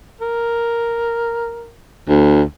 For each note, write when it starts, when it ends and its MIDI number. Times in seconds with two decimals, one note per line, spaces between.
0.21 1.72 70
2.09 2.42 38